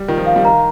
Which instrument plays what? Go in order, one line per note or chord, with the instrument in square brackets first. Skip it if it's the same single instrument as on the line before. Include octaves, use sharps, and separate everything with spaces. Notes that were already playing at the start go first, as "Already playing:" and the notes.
Already playing: [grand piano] G3
[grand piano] D#3 [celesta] F4
[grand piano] F3
[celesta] F5
[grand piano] G3
[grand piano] D#3 [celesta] A#5